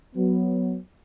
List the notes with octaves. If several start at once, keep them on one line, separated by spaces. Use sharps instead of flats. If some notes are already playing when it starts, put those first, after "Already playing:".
F#3 B3